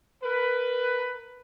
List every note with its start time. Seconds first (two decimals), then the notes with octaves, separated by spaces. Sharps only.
0.22 A#4 B4